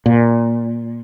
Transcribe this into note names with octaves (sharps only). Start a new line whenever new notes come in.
A#2